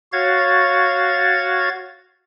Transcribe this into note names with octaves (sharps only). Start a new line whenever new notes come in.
F#4 C#5 F5 G#6 A6